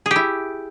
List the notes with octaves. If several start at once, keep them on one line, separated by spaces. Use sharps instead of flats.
E4 G4 G#4